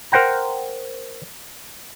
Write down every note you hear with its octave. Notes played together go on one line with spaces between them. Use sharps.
A#4 C5 F#5 G5 A#5